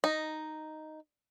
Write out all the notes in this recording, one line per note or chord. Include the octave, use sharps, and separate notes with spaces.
D#4